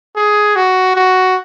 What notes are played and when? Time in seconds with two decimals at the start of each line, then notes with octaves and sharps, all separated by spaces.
0.16 G#4
0.56 F#4
0.96 F#4